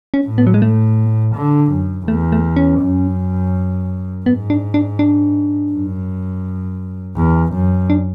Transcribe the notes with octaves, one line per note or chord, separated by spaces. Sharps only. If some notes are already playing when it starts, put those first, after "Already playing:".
C#4
A2
B3
F#3
G#3
A3
D3
F#2
E2 A3
A3
C#4
F#2
G#2 B3
D4
D4
D4
F#2
E2
F#2
D4